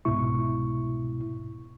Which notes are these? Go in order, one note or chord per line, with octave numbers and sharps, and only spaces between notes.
C2 G#2 B2 E4 C#6